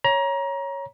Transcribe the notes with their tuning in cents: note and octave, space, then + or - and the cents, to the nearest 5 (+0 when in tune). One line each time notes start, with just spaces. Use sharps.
C#5 +0 A#5 +25